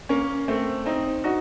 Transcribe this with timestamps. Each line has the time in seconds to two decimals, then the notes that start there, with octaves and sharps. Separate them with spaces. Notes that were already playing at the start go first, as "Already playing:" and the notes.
0.09 A#3 C#4
0.48 A3 C4
0.86 C4 D#4
1.24 D#4 F#4